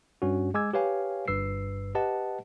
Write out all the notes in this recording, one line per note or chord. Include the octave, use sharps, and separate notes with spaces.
G2 C#4 F#4
G#3 G#5 D6 E6 G#6
G4 B4 C#5 F5 G#5
G1 G2 B4 E6 C7
G4 B4 D#5 F#5 A5